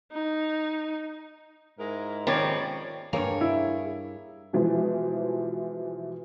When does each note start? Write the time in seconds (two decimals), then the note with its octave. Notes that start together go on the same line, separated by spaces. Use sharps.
0.12 D#4
1.79 G#2 G#3 E4 A#4
2.27 C3 D#3 F3 C4 C#4 C#5 D5 B5
3.13 G2 A#3 G#4 C#5
3.41 E4
4.53 B2 E3 F3 G3 G#3